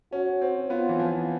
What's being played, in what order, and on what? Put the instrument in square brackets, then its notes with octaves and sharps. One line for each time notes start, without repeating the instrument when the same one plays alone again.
[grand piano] C#4 [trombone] F#4
[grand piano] C4
[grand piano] B3 [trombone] F4
[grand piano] E3
F3